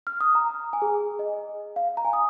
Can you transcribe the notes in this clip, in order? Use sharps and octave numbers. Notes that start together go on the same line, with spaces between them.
F6
D#6
A#5
G#5
G#4
D#5
F5
A#5
G#5
D#6